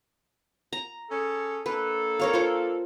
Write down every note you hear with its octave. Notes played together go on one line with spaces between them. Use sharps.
A#5
C#4 G#4 A4
A#3 D4 A4 B4
A#4 C#5 F5
F4 C5